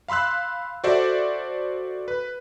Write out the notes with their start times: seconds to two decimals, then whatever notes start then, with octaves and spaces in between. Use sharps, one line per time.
0.08 F5 B5 C6 E6 F#6
0.84 F#4 A4 C5 D5 E5
2.08 B4